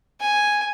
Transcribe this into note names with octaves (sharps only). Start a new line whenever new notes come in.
G#5